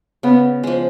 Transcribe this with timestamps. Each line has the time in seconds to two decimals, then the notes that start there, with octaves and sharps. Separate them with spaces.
0.23 C#3 B3
0.63 F3 G#3